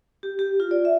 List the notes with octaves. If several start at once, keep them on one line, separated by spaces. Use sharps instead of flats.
G4
G4
F4
D5
E5